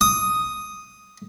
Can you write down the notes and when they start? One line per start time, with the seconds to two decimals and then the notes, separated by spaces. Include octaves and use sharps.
0.01 D#6